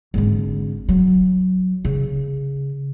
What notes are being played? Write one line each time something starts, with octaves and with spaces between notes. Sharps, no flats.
G#1 D3
F#3
C#3